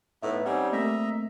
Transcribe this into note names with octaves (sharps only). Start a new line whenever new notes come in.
A2 B3 D#4 B4 E5
G3 C4 C#4 D#4 F#5
A3 A#3 C4 D#5 E5 A#5